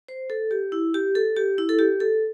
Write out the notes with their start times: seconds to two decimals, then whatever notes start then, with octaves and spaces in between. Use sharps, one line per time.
0.08 C5
0.30 A4
0.51 G4
0.72 E4
0.94 G4
1.15 A4
1.36 G4
1.58 E4
1.69 A4
1.79 G4
2.00 A4